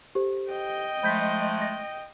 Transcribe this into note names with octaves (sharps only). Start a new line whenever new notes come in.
G4 A4 C5
D#5 G5
F3 G#3 A3 B5 G6 B6
A#6